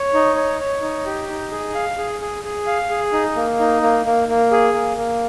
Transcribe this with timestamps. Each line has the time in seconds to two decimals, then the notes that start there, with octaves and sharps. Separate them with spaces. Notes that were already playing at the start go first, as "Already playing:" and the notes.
Already playing: C#5
0.14 D#4
0.36 C#5
0.60 C#5
0.82 D#4
1.06 G4
1.29 D#4
1.51 G#4
1.75 F5
1.98 G#4
2.21 G#4
2.44 G#4
2.67 F5
2.90 G#4
3.13 D#4
3.36 A#3
3.59 D#4
3.82 A#3
4.05 A#3
4.28 A#3
4.51 G#4
4.74 A#3
4.97 A#3